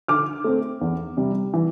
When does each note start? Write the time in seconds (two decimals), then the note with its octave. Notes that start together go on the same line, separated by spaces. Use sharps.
0.08 D3 D6 F6
0.44 A3 C4
0.81 E2
1.17 C3 G3
1.54 E3